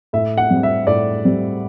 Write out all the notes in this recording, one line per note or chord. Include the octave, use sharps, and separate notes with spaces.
A2 E5
F#5
G3 C4
E5
A2 D5
G3 C4